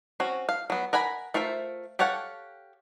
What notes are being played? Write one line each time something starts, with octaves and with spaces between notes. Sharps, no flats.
C4 C#4 F#4
F5
F#3 B3
A#4 F#5 G#5 B5
A3 F4 A#4 C5 E5
G4 A4 C#5 F5 F#5